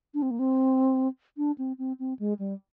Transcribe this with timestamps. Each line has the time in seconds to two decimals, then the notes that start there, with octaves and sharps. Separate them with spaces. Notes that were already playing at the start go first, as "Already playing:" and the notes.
0.14 D4
0.22 C4
0.31 A#3
0.39 C4
1.37 D4
1.58 C4
1.78 C4
1.99 C4
2.19 G#3
2.39 G3